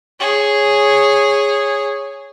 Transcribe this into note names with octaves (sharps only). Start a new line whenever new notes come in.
G#4 C#5